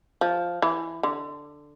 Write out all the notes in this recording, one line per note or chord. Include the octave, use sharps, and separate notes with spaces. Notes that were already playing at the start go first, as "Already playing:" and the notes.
F3
E3
D3